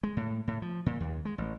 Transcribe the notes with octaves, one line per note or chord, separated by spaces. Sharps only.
G#3
A2
A2
F3
A#2
D#2
G#3
A1